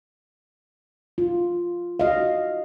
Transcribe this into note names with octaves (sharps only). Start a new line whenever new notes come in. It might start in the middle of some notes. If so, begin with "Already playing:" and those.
F4
F#4 D#5 F5